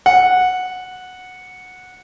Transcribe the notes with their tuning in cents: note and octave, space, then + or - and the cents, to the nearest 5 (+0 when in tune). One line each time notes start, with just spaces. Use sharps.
F#5 -10